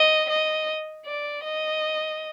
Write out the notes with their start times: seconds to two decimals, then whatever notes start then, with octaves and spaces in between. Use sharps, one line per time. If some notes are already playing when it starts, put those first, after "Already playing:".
Already playing: D#5
0.29 D#5
1.06 D5
1.44 D#5